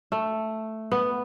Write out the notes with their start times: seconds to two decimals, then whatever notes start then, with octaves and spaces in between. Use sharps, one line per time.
0.12 A3
0.92 B3